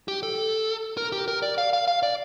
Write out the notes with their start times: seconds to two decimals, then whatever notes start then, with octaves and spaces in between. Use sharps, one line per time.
0.08 G4
0.23 A4
0.97 A#4
1.12 G4
1.28 A#4
1.42 D5
1.58 F5
1.73 F5
1.88 F5
2.03 D5